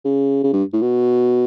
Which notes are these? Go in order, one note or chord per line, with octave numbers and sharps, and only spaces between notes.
C#3
C#3
G2
A2
B2